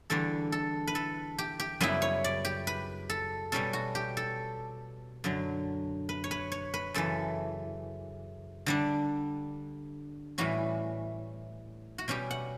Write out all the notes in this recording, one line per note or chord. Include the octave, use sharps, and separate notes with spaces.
E2 D3 G3 D4 A4
A4
B4
A4
G4
G4
F#2 C#3 G3 B3 E4 B4
C#5
D5
G4
B4
A4
B2 G3 C#4 A4
F#4
G4
A4
F#2 D3 F#3
B4
C#5
B4
C#5
B4
F#2 C#3 E3 A4
D3 G3 D4
A2 E3 G3 C#4 F#4
F#4
B2 G3 C#4 G4
F#5